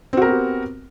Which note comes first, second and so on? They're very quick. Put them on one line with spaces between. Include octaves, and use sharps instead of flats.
C4 F#4 A#4 B3 G4